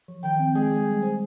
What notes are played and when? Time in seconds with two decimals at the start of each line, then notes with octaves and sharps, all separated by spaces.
0.08 F3
0.24 D#3 G5
0.39 C4
0.55 G#3 G#4
0.71 G#3
0.87 G3
1.03 C5